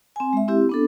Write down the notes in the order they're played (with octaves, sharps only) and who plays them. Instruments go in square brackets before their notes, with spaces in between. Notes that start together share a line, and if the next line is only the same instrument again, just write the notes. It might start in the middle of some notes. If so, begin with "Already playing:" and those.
[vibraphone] C4 G#5
G#3 E5
C4 E4 G4
B3 D4 A4